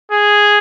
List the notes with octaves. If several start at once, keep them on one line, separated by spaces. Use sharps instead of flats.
G#4